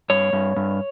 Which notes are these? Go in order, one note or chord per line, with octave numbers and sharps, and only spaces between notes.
G2 C#5
G2
G2